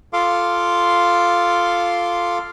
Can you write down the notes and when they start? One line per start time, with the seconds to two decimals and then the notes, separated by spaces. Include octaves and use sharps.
0.13 F4 A4 F5 C6 D6